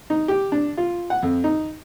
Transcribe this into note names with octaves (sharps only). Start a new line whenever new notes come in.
D#4
G4
D4
F4
F#5
F2
D#4